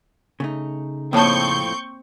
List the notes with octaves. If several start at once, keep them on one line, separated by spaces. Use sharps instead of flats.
C#3 A3 D#4
F2 A2 A#3 C4 C#5 A5 C#6 G6